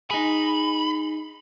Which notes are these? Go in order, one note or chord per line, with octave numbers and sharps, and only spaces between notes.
D#4 G#4 B5